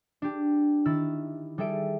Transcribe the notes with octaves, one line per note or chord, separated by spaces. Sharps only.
D4 G4
D#3 E4 E6 A6
G3 G#4 A4 E5 D7